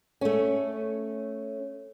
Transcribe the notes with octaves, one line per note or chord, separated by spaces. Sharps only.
A3 C#4